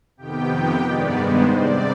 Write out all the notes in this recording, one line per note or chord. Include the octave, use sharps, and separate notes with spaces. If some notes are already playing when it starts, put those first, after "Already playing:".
F2 C3 D#3 B3 G4 G5
G4 G5
G2 D#3 G#3 B3 D5
C5
C3 G3 C4 D5